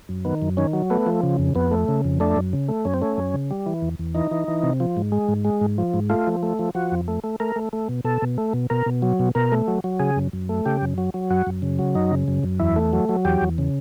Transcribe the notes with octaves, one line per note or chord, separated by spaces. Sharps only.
F#2
D#3 B3
F#2
D#3 C#4
F#3
A3 B3
F3
C#3
F2
F2 B3
A3
C#3
F2
A3 D4
F#2
C#3
A3
F#2 C#4
C4
A3 C#4
F#2
C#3
G3
E3
E2
E2
E3 D#4
E3
E3
C3
F3
G#2
G#3
G#2
G#3
G#2
F3
G#2
A3 F4
F3
A3
F3
F3 F#4
F2
A3
A3
A3 A#4
A3
A3
B2
B2 A4
B2
A3
B2
B2 A#4
B2
F#3
B2
B2 A#4
A3
F#3
F#3
C#3 G#4
F#2
F#2
A3
C#3 G4
F#2
F#3
F#3
F#2 F#4
F#2
C#3
F#3
F#2 D#4
C#3
F#2
F#2
E2 E4
A3
F#3
F#3
E2 G4
E2
C#3